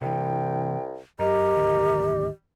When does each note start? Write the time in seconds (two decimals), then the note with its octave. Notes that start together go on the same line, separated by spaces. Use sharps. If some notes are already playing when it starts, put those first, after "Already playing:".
0.02 C2 C3 E3 G5
1.20 F#2 G4 A#4 D#5
1.57 G#1 D2 D#3